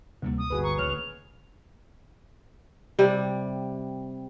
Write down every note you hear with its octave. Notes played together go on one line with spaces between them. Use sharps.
D2 C3 G3 A#3 C4
D#6
G1 F#4 G#4 B4
A#5 C#6
G#1 D2 C#3 C#5 F6 F7
C3 G3